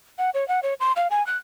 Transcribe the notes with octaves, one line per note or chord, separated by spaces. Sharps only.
F#5
C#5
F#5
C#5
C6
F5
G#5
F#6